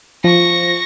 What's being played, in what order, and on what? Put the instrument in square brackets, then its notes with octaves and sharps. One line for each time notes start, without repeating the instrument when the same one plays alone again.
[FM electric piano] F3 [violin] C#6 A#6